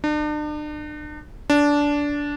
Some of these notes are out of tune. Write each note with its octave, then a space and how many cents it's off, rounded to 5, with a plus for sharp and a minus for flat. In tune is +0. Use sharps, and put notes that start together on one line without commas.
D4 +40
D4 -15